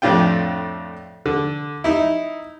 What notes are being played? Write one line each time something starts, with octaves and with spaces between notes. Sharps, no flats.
F2 A2 D4 F4 G5
D3
D#4 E4